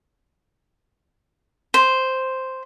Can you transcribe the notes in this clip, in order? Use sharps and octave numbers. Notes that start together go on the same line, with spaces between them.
C5